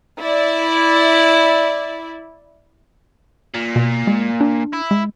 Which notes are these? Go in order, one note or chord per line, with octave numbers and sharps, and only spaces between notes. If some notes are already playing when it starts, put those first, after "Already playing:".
E4 D5
A#2
B2
G#3
D4
E4
G#3